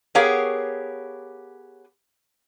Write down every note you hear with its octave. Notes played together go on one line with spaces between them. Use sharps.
B3 G4 G#4 A#4 C#5 F5